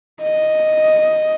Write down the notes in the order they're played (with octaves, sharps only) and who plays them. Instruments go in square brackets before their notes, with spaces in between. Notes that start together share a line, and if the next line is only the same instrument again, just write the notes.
[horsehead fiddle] D#5